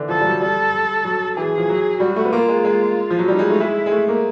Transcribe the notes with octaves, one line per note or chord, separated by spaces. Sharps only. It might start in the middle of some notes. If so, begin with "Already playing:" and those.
Already playing: D3 E3
F3 A4
G3
F#3
G3 A4
F#3
E3 G#4
F3
F#3
G3 F#4
A3
B3
A#3 F4
G#3
G#3
F3
F#3
G3 D#4
G#3
A3
G#3 E4
G#3
A3
A#3